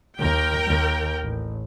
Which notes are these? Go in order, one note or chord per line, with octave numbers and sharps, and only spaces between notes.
D#2 A#4 G5
D#2
A1